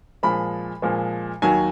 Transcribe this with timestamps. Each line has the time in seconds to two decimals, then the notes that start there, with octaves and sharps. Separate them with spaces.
0.23 A#2 F3 G#3 B5
0.82 A#2 F3 G#3
1.42 D#2 D#3 F#3 G#5